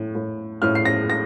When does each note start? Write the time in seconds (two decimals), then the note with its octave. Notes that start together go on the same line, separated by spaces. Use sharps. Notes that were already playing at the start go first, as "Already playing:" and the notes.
Already playing: A2
0.15 A2
0.62 A2 F6
0.75 C7
0.85 A#6
1.10 A#6